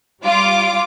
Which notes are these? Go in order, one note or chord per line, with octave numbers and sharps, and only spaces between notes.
G3 F4 D6